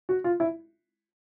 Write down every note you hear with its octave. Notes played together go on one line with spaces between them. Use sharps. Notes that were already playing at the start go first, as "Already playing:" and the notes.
F#4
F4
E4